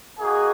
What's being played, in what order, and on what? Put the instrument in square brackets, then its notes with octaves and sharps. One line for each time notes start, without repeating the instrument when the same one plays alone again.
[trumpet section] A#3 D#4 F#4 G#4